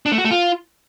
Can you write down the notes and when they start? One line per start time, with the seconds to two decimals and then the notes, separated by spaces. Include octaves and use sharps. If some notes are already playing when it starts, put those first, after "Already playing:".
0.06 D4
0.12 A3
0.18 F#4
0.24 A3
0.31 F4